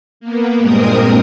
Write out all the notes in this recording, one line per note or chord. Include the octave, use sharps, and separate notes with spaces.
A#3 B3
G2 A#2 G#3 C4 A#4 D#6